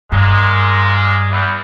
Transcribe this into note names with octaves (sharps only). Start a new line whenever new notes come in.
G2 A#2 G#3
E2